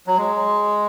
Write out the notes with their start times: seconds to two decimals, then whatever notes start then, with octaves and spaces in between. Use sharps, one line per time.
0.07 F#3
0.18 G#3